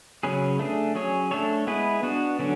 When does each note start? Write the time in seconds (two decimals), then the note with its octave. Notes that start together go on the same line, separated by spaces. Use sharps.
0.23 C#3 F#3 C#4 G#4 B4
0.59 A3 D4 G#4
0.95 F#3 C#4 G#4 C#5
1.31 A3 D4 A4 C#5
1.67 G#3 B3 E4 G#4 B4
2.03 B3 D4 F#4
2.39 D3 F#3 C#4